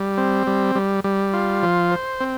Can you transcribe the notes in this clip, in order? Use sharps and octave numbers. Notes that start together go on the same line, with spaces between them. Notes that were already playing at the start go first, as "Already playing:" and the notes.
Already playing: G3
C4
G3
G3
G3
F4
F3
C5
C4